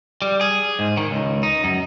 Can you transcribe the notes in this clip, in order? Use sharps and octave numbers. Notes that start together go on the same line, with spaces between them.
G3
G#4
G#2
D#3
C#2
D#4
F#2